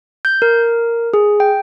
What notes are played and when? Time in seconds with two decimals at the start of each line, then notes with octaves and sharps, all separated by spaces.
0.25 G6
0.42 A#4
1.14 G#4
1.40 G5